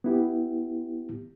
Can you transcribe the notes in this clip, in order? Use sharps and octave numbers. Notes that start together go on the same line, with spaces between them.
B3 E4 G4